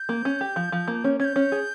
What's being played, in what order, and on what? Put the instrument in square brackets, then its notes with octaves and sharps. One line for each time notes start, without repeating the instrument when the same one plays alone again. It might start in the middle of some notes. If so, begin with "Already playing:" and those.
Already playing: [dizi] G6
[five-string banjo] A#3
C#4
G4
F3
F3
A#3
C#4
[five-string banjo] C#4 [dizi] G#6
[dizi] G6
[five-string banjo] C#4
G#4